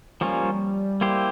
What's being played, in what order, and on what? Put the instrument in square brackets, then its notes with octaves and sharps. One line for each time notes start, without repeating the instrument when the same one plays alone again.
[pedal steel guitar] F3 A#3 C#4 F4 [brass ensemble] G3
[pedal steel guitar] A#3 E4 G4 C5